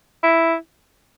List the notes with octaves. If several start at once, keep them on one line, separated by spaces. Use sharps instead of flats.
E4